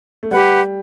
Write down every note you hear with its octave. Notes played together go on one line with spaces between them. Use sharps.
A3
G3 G4 B4 F#5